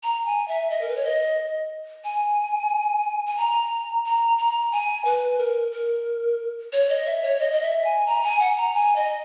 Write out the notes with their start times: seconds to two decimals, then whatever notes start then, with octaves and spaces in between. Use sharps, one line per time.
0.03 A#5
0.25 G#5
0.48 E5
0.70 D#5
0.81 A#4
0.89 B4
0.96 C#5
1.04 D#5
2.04 G#5
3.26 G#5
3.37 A#5
4.05 A#5
4.38 A#5
4.72 G#5
5.05 B4
5.38 A#4
5.72 A#4
6.73 C#5
6.89 D#5
7.06 E5
7.23 C#5
7.39 D#5
7.53 D#5
7.62 E5
7.84 G#5
8.06 A#5
8.23 G#5
8.40 F#5
8.56 A#5
8.74 G#5
8.96 D#5